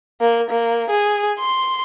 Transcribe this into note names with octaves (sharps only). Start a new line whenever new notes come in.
A#3
A#3
G#4
C6